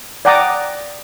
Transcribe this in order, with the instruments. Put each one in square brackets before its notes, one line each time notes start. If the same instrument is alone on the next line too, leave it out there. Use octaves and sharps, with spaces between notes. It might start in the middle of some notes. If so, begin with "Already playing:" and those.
[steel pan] D5 F#5 G5 A#5 D6 D#6